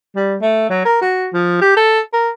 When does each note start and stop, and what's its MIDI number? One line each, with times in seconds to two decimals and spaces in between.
0.15 0.36 55
0.41 0.67 57
0.69 0.84 54
0.85 0.97 70
1.01 1.27 66
1.33 1.57 53
1.61 1.74 67
1.77 2.00 69
2.13 2.30 70